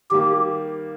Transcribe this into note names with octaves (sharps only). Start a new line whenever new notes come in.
D#3 G3 A#3 G4